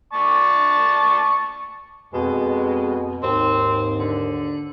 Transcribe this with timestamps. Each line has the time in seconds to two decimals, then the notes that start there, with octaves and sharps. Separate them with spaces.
0.13 D5 A5 C#6
2.14 F2 B2 G#3
3.23 D#2 G#2 C4
3.98 D3